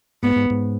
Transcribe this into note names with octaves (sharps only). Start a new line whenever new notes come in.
G#2 B3
G#2
G#2